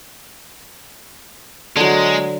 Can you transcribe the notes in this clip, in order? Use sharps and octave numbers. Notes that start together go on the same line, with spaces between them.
D3 F#3 G#3